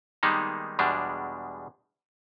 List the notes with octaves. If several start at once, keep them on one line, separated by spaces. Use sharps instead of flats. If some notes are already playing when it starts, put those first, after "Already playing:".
D#3 G3 G#3 A#3 B3 D#4
E2 B2 G3 G#3 D4